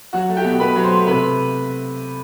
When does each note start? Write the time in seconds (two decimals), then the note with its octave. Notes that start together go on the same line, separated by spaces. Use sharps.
0.13 F#3 F#4 F#5
0.29 A3
0.37 G4 G5
0.44 B2
0.60 B2 B4 B5
0.76 F#3
0.84 C5 C6
0.91 A3
1.07 C3 B4 B5